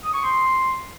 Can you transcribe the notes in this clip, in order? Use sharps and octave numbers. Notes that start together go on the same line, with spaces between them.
D#6
C#6
C6